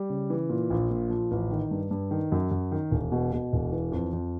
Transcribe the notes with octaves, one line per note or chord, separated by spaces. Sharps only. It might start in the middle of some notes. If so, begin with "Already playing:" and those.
Already playing: G3
C#3
E3
A#2
A#1
A#2
F3
A1
D#3
G2
G2
D#3
F#2
F#2
D#3
E1
B2
B2
E1
E3
F2
F2